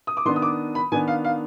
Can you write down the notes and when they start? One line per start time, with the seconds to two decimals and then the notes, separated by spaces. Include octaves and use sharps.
0.07 D#6
0.17 D6
0.25 D#3 B3 D4 C6
0.36 D#6
0.42 D6
0.75 B5
0.92 D#3 B3 D4 G#5
1.08 F5
1.24 F5